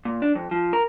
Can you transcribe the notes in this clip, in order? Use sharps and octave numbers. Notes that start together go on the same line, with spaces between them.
A#2
D4
F2
F3
A#4